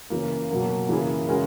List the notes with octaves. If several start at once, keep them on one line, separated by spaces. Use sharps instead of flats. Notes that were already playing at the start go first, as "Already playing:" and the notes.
C#3 E3 A#3
B2 F#3 A#3
C#3 E3 A#3 E4 G#4
C#3 G#3 C#4 F#4 A#4